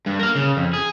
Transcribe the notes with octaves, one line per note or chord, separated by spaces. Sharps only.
G2
A#4 F5
C#3
F2
G#4